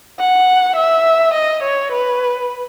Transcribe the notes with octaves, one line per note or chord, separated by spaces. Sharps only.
F#5
E5
D#5
C#5
B4